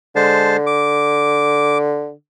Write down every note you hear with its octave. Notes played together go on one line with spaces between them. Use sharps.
D3 G#3 C5 A5
D6